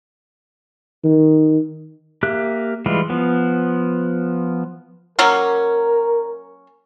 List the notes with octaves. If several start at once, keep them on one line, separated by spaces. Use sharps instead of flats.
D#3
A#3 G4 E5 F#6
E3 G3 G#3 F4
F3 B3
F#3 A#3 C#4 A#4